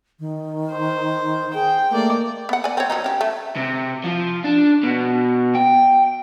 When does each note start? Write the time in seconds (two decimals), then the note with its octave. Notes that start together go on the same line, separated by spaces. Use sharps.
0.19 D#3
0.71 C5
1.54 G#4 G5
1.91 A3 A#3 D5
2.49 B3 F#5
2.64 D5 G#5
2.77 C4 C#5
2.90 F3 F#3 D#4
3.04 C#4 G4
3.21 A3
3.57 C3
4.04 F3
4.44 D4
4.83 B2
5.55 G5